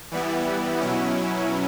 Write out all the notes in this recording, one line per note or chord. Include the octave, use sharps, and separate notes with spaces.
E3 G3 B3 E4
B2 F#3 C#4 E4